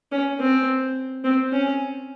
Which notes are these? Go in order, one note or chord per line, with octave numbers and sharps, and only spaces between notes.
C#4
C4
C4
C#4